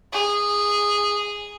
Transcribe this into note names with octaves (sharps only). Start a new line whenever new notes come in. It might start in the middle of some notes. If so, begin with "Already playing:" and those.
G#4